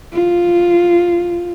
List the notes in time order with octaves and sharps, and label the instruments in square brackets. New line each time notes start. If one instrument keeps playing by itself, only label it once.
[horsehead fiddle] F4